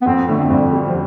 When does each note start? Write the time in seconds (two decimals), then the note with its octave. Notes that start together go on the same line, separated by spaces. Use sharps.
0.02 B3
0.06 F2 C4
0.28 D3 A3
0.50 F2 G3
0.72 G3
0.89 F3